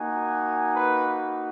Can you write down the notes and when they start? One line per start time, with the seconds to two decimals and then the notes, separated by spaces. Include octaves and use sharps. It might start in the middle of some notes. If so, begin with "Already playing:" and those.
Already playing: A#3 D#4 F#4 G#5
0.73 B4